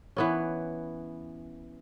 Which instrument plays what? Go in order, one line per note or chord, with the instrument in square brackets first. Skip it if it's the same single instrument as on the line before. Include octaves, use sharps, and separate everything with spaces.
[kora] E3 B3 C#4